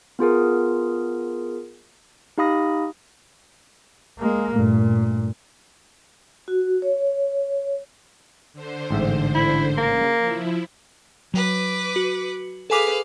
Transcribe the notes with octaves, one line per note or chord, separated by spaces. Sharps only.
B3 F4 G#4 A#4
D#4 G4 F5 B5 D#6 A#6
G#3 A#3
G2 A#2 A3
F#4
C#5
D3 C5
A1 G#2 E5
E4
C#3 A#3
F3 E4
F#3 B4 D6
F#4
G#4 A4 B4 F5 G#5 D6